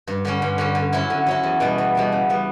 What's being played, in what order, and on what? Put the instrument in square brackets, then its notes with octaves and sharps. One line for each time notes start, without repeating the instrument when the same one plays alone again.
[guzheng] G2
D3 G3 C#4
G2
D3 G3 C#4
D3
F#3 C#4 E4
D3
F#3 C#4 E4
E2
B2 G3 B3
E2
B2 G3 B3
C#3
G3 B3